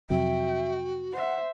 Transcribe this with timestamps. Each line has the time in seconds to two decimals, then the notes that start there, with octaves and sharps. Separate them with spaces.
0.10 F2 C3 F#3 F#4 E5 G5
1.13 C5 E5 F#5